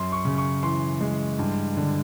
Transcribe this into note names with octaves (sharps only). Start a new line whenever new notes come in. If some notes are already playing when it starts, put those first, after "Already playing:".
Already playing: F#2 C6
C#6
C#3
C#6
E3 C6
G#3
G2
D3